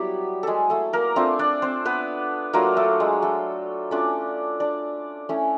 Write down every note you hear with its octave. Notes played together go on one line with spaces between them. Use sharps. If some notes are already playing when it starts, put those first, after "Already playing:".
Already playing: F#3 G3 B3 E4 G4
G#3 G#4 A4
A3 A4
A#3 A#4
A3 C4 D4 F4 C5
D4 D5
C4 C5
B3 B4
F#3 A3 A#3 D4 F4 A#4
A3 A4
G#3 G#4
A3 A4
A3 C#4 D4 F4 D5
D4 D5
A3 C#4 E4